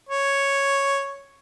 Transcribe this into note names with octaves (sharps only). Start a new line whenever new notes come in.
C#5